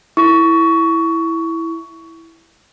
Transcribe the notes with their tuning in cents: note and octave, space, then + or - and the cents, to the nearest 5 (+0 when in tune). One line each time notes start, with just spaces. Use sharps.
E4 +0 C#6 +20